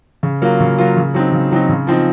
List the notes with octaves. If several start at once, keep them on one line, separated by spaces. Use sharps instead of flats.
C#3
F#3 A#3 F4
C#3
F#3 A#3 F4
C#3
F#3 C4 D#4
C#3
F#3 C4 D#4
C#3
F3 C4 D#4